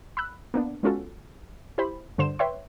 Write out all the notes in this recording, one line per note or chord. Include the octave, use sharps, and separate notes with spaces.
B5 E6 F#6
A#3 B3 D4
G#3 B3 C#4 F4 F#4 A4
E4 G4 C5 B5
G2 D3 C5 C6 E7
B4 C#5 E5 G5 C6